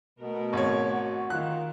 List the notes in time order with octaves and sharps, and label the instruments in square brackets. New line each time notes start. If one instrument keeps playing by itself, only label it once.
[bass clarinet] B2 [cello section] A3 B3 A#4
[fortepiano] G#1 C#5
[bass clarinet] F#4
[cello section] D#3 [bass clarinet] F4 [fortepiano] F#6